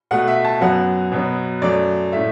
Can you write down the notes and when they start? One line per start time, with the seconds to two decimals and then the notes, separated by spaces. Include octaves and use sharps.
0.11 B2 A3 F#5
0.28 E5
0.45 A5
0.61 F#2 F#3 B3 F#5
1.12 B2 F#3 B3
1.62 F#2 F#3 A3 D5
2.12 A2 A3 E5